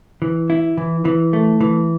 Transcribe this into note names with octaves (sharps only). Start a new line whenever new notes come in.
E3
E4
E3
E3
A3
E3